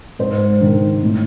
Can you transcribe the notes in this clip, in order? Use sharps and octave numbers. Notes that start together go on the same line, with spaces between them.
G#2 C5
D#3
A2